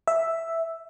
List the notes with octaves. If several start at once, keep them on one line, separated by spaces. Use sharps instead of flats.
E5